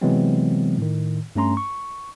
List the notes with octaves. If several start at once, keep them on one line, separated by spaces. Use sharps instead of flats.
C3 E3 F#3 G#3 B3 C4
A2 D#3
G2 A3 C#4 A#5 C6
C#6